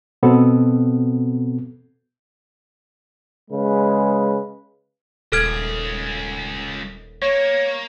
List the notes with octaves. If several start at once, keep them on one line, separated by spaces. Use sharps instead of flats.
B2 B3 C4 A4
C#3 G#3 B4
D#1 C#2 G#4 A4 F6 G#6
A#3 C#5